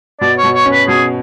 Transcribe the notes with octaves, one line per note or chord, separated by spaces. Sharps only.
B2 D5
C#5
B2
C#5
C#4
B4
B2 G#4